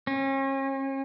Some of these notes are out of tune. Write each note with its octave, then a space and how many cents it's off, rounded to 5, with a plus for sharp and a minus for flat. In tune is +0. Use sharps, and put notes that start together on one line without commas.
C#4 -40